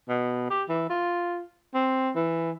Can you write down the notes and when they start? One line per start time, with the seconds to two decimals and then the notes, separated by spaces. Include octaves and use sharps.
0.09 B2
0.50 G4
0.69 E3
0.90 F4
1.74 C4
2.15 E3